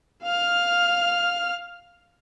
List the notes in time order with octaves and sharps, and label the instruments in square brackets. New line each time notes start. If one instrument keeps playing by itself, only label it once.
[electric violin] F5 F6